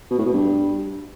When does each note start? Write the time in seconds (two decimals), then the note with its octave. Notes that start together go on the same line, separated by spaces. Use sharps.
0.11 B2
0.18 A2
0.26 B2
0.33 G2